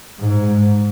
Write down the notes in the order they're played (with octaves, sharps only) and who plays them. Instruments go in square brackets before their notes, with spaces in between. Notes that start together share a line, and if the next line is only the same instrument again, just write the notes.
[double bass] G#2